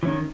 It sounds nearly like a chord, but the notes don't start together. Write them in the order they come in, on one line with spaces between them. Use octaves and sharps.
E3 C#4 D#3